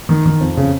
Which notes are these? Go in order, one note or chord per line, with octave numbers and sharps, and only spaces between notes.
D#3
D#3
F2
C#3